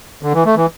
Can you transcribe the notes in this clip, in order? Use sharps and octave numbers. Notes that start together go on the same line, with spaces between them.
D3
E3
A3
E3